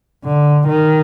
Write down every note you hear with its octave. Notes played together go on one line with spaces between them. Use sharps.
D3
D#3